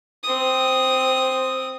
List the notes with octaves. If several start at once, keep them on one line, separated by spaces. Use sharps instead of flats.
C4 D#6